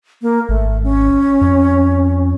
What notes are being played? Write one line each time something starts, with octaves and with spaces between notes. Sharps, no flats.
A#3
G#1 A3
C#4
F2